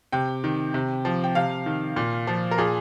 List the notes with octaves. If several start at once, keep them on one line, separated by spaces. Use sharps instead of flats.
C3 G5
D#3
C3
F3
G5
C3 F5
D#3
A#2
F3
A#4
A#2 G#4